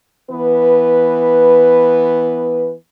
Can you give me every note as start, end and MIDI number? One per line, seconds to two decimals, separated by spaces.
0.30 2.73 52
0.30 2.73 59
0.30 2.73 71